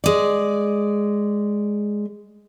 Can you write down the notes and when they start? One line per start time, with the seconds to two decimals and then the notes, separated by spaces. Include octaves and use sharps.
0.04 G#3 D5